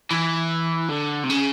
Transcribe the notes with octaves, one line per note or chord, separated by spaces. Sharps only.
E3
D3
C3
C#3